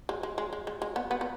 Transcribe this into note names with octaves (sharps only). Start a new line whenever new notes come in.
G#3
G#3
G#3
G#3
G#3
G#3
B3
B3
B3